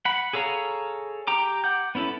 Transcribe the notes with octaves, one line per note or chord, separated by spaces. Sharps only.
F#5 B5
G#4 A4 C#5 F5 A#5
G4 G5 A#5 D6
F#5 D6 G6
B3 C#4 E4 A4